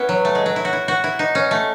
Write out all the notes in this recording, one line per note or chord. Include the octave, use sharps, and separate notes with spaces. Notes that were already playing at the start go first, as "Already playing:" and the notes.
Already playing: B3 C#4 E4
F#3
A3
G#3
F#3
E4
F#4
E4
F#4
E4
D#4
C#4
A3